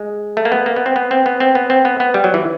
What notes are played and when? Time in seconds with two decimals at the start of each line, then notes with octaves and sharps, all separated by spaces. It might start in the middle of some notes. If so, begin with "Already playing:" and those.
Already playing: G#3
0.37 A3
0.45 A#3
0.52 B3
0.66 A#3
0.76 B3
0.86 C4
0.96 B3
1.11 C4
1.26 B3
1.40 C4
1.55 B3
1.70 C4
1.85 B3
2.00 B3
2.14 G3
2.24 F#3
2.34 E3